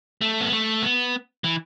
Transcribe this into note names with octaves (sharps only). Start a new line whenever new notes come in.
A3
B3
A3
B3
E3